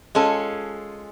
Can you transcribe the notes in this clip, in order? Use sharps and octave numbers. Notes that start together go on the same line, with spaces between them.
G#3 C#4 F4 A4